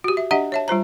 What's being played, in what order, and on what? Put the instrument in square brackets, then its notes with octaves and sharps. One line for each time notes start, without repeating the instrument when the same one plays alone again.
[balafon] F#4 G4
E5
D4 G4 D#5 E5 F#5
C#5 E5 A5
G3 F4 C5 A#5